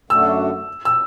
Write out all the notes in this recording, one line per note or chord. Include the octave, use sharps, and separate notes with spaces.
F#2 D3 A3 D4 F#4 E6
E6